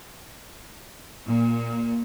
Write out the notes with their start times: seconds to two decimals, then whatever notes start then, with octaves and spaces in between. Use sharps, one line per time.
1.26 A#2